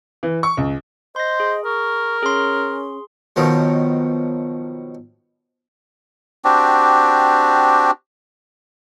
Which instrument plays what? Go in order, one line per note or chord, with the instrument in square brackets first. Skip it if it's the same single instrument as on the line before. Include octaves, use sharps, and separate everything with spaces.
[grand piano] E3
C#6
C#2
[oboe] C5 [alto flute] D#5 [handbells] C6 A#6
[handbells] G#4
[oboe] A#4 [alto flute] C#6
[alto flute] C#4 [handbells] G#4 C6
[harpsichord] B2 D#3 F3 F#3
[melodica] C4 D4 F#4 G4